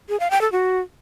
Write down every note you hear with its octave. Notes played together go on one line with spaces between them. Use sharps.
G#4
F5
G5
A4
F#4